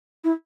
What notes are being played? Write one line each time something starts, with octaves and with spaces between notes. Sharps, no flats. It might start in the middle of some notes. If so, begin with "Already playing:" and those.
E4